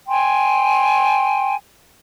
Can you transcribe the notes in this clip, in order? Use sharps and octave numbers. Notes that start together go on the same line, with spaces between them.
G5 G#5 C6